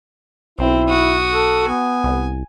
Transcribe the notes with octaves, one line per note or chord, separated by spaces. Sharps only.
B1 C4 E4
F#4 D#6
A4
B3 G#5
C2